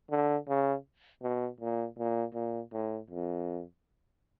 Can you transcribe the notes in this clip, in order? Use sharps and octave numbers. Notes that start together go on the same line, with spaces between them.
D3
C#3
B2
A#2
A#2
A#2
A2
F2